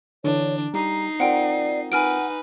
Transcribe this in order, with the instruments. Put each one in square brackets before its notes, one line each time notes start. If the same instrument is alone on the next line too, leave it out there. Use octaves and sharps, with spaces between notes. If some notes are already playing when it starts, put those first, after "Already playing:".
[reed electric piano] D3 E3 [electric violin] D4 [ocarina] C#5
[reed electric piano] G3 G4 [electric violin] D#4 C7 [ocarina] A#5
[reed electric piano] C4 F4 A#4 [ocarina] D5 [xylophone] F#5 G5
[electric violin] D#4 B4 [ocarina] F#5 [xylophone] G#5 F6 D7